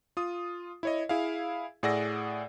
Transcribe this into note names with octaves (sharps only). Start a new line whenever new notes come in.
F4 D#6
E4 C#5 D#5
E4 G#4 F5
A2 G#4 D5 F#5 E6 A#6